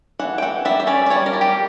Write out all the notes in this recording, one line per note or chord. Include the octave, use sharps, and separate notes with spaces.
E3 F#5
G5
E3 F#5
G3 E5
E5
C#4 D5
D5
G3 C#5
A#4
G3
G4